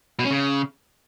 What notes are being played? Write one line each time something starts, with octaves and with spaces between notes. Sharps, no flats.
B2
C#4
C#3